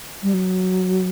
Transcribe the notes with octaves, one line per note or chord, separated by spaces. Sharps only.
G3
F#3